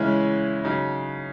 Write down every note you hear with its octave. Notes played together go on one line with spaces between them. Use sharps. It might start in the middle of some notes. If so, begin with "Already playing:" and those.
Already playing: C#3 E3 G#3 C#4
C#3 F#3 D#4